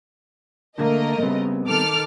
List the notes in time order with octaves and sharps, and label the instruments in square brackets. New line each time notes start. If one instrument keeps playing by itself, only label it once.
[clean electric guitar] D3 [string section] A3 A#4 D#5 [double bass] A#3
[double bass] C#3 [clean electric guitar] G3 B3 C4
[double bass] D#3 [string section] A4 D6 F6